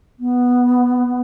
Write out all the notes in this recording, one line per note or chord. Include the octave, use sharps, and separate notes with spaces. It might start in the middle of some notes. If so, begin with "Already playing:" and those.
B3